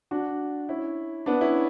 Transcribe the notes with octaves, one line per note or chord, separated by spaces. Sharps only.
D4 F#4
C#4 E4
B3 D4
C#4 E4